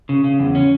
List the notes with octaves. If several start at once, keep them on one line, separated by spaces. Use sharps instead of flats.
C#3
C#3
E2
C#4